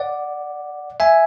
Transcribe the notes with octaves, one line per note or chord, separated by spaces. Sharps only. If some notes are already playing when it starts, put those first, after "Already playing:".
Already playing: D5 F#5
E5 G#5